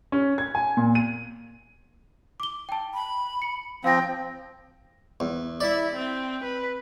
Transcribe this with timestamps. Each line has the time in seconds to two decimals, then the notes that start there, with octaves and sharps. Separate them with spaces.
0.12 C#4
0.38 G#6
0.55 G#5
0.77 A#2
0.95 D#7
2.40 D6 G7
2.69 G5 A5
2.94 B5
3.42 C#7
3.84 F3 C4 F5 G5 A#6
5.20 E2
5.61 E4 D5 E5
5.95 C4
6.44 B4